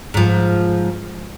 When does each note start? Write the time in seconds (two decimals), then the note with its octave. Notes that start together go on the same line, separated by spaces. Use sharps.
0.14 G#2 F3